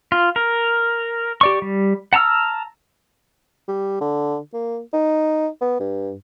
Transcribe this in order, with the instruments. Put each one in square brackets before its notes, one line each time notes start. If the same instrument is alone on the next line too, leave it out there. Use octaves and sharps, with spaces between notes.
[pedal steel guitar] F4
A#4
G4 D5 C#6
G3
F#5 A5 A#5 E6 F6
[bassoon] G3
D3
A#3
D#4
B3
G2